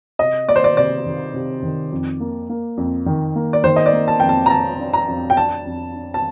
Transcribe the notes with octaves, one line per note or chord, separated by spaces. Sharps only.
C3 D#5
A#3 D5
C5
D5
C3 D5
D#3
C3
D#3
F2
A#3
A#3
F2
D#3
A#3
D5
D#3 C5
D#5
D5
A#3
A5
F2 G5
A5
A#5
F2 A5
D4
A#5
F2
G5
D4 A5
F2
D4
A5